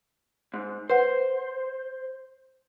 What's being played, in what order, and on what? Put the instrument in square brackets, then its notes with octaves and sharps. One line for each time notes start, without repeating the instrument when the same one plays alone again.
[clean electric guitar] G#2
[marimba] B4 F#5 [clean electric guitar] C5